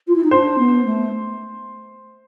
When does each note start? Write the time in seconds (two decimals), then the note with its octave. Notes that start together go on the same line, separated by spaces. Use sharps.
0.07 F4
0.15 E4
0.24 D#4
0.31 D4 C5
0.58 B3
0.85 A3